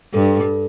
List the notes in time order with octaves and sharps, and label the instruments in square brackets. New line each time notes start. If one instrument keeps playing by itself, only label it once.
[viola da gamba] G2 [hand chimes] A4